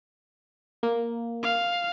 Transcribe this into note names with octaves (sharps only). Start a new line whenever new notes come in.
A#3
F5